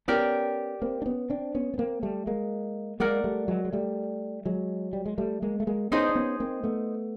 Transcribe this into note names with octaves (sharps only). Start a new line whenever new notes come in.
B3 C#4 G4 A#4 D5 G5
A#3 C4
D4
B3 C#4
C4 D4
B3 C#4
B3
A#3 C4
G3 A3
G#3 A#3
G#3 A#3 A#4 D5 F#5
G3 A3
F#3 G#3
G#3
G3 A3
F#3 G#3
G3
G#3
G3 A3
G#3 A#3
A3
G#3 A#3
B3 C#4 D#4 G#4 C5 D#5
D4
B3 C#4
A#3 C4
A3 B3